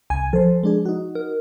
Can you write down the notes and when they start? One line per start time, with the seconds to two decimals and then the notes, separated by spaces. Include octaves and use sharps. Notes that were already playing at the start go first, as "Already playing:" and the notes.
0.10 C2 G#5 G#6
0.33 F3 A4 C5
0.63 G#3 D4 G#4
0.85 D#4 F#4
1.15 A#4